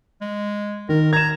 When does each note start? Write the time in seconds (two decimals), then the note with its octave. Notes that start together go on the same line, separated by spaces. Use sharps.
0.21 G#3
0.89 D#3 A#4
1.13 A#5 G#6 E7